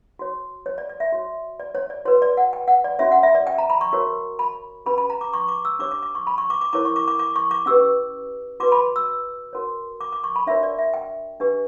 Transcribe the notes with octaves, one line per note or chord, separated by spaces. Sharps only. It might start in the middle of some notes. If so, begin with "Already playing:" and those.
F#4 C#5
C#5
D5
D5
E5
F#4 C#5
D5
C#5
D5
F#4 B4 C#5
D5
F#5
G5
F#5
D5
C#4 F#4 C#5 E5
F#5
E5
D5
G5
A#5
B5
C#6
F#4 A#4 C#5
B5
C#4 G4 B4 B5
B5
A#5
D6
C#6
D6
E6
D4 G4 C#5 D6
D6
D6
C#6
B5
C#6
D6
D6
E4 A#4 C#5 D6
C#6
D6
D6
D6
C#6
D6
C#4 G4 B4 E6
F#4 B4 D6
B5
E6
F#4 A#4 C#5
D6
D6
C#6
B5
D4 F#4 A#4 C#5 E5
D5
E5
G5
D4 G4 B4